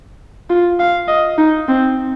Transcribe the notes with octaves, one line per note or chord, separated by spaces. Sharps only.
F4
F5
D#5
D#4
C4